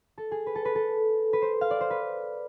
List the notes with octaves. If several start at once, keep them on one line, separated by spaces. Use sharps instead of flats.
A4
G#4
B4
A4
B4
A4
B4
C5
F5
D5
C5
B4